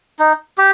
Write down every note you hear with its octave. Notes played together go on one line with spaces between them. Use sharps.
D#4
G4